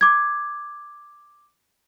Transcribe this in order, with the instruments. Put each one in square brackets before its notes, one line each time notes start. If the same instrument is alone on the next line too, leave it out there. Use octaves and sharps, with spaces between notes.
[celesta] D6 G#6